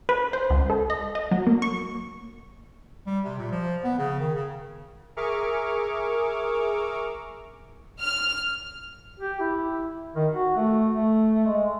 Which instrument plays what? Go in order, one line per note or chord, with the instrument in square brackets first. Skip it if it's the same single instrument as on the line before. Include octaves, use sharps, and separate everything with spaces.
[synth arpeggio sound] B4
C5
C#2
A4
D#5
D#5
F#3
A#3
C#6
[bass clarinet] G3
C3
A#2
F3
B3
C#3
D#3
C#3
[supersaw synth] G#4 A#4 E5 C#6 D6 F6
[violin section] F6
[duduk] G4
E4
D#3
F#4
A3
A3
G#3